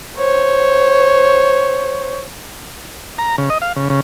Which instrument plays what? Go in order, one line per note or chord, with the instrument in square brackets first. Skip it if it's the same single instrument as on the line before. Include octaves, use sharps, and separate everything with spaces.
[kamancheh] C5 C#5
[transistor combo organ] A#5
C#3
D#5
F5
C#3
C#3